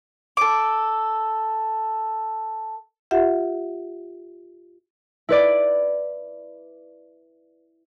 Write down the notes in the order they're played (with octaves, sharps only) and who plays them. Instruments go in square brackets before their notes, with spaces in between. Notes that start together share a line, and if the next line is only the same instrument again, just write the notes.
[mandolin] A4 D6
[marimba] F4 G4 E5 F#5
[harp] E4 B4 D5